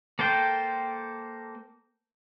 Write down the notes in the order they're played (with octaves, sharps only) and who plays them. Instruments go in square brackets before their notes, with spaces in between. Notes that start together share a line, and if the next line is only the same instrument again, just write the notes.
[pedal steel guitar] A#3 A4 C5 G5